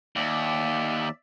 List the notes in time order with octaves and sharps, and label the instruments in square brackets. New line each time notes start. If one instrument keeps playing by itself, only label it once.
[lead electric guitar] D#2 [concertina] D5 E5